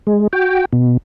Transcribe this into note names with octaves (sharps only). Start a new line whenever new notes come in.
G#3
F#4 G5
B2